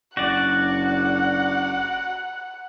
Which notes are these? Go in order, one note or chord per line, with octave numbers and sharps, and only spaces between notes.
F#1 D4 F#4 D5 F#5